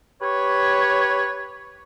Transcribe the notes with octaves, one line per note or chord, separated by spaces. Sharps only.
G4 B4 C#5